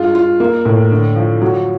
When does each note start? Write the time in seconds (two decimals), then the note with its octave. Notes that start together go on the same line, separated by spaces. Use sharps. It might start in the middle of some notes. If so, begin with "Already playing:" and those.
Already playing: G2 G#3 F4
0.15 F4
0.40 A#3
0.65 A2
0.91 D3
1.16 F3
1.41 F#3